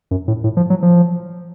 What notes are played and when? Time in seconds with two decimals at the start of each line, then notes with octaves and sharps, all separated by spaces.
0.11 F#2
0.28 A2
0.44 A2
0.57 F3
0.70 F#3
0.82 F3